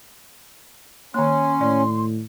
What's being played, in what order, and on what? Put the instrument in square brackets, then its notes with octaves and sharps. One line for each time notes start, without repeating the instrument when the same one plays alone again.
[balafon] D#3 A#3 [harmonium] C#4 [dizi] C6
[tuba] A2 [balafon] D5